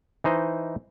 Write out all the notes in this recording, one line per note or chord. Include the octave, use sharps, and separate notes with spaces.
E3 D#4 C5 D#5